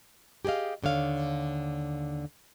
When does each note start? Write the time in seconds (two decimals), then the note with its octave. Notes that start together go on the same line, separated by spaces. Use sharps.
0.45 G4 G#4 B4 D#5 F5
0.83 D#2 D3 C#5 F5